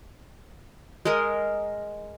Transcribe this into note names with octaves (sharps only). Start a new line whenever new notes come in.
G#3 G#4 A#4 D#5